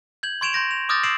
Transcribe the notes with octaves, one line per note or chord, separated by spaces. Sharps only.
G6 G#6 F#7
C6 C#6 G#6 D7 E7 F7
C6 G6 A#6 D7
F7
D6 D#6 F6 G6 A6 A#6
E6 C7 D7 E7 F#7